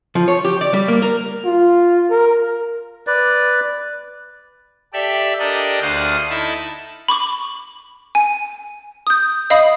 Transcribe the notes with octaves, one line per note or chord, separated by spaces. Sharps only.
F3
C#5
G4
D5
G3
A#3
A#4
F4
A#4
B4 D5
G4 A4 D5 E5
D4 G4 A4 A#4 D5 D#5
D2 D4 C5 F5 F#5 D#6
D#4 E4 A4 E5 A5 B5
B5 C#6 D6
G#5
D#6 G6
D#5 F5 B5 D#6